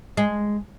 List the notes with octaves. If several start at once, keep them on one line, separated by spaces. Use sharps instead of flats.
G#3